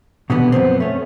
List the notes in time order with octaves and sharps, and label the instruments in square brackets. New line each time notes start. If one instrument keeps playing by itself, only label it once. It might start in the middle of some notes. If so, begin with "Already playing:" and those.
[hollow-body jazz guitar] B2 D3 E3 G3 B3
F#2 F3 B3 C4
A3 C#4